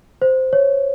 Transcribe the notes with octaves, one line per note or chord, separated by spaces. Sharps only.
C5
C#5